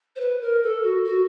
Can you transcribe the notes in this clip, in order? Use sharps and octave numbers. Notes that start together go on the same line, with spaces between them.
C5
B4
A#4
A4
F#4
F#4